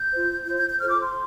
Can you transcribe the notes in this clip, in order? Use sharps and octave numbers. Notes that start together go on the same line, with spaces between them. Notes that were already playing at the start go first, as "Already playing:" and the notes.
Already playing: G6
F4 C5
F4 C5 G6
G6
G6
F4 A4 C5 F6
D6
C6